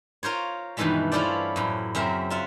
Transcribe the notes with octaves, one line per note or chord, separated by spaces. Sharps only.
F4 A#4 C5 C#5
G2 B2 D#3 E3 G#3 A3
C#4 E4 F4 A4 C5 D5
F#2 A2
F#2 C#3 C4 A#4 E5
F4 E5 F#5